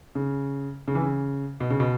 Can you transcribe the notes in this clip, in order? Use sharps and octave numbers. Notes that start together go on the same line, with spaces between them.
C#3
C#3
E3
C#3
B2
C#3
B2